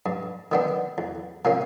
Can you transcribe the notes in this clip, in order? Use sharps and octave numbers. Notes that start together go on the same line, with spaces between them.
G2
D#3 G3 B3 D4
E2
C3 F3 A#3 C#4